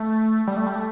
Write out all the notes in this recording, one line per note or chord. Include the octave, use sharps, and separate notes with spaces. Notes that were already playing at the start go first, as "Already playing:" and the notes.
Already playing: A3
G3
A3
G3
A3